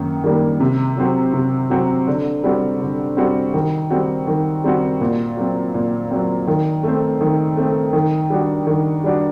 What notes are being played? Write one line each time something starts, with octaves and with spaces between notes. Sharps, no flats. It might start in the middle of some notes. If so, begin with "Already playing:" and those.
Already playing: F#2 D#3 A#3
D#3 G3 A#3
C3
F#3 C4 F#4
C3
F#3 C4 F#4
D3
G3 C4 F#4
D3
G3 C4 F#4
D#3
G3 C4 F#4
D#3
G3 C4 F#4
A#2
F#3 C4
A#2
F#3 C4
D#3
A3 C4
D#3
A3 C4
D#3
G3 D4 F#4
D#3
G3 D4 F#4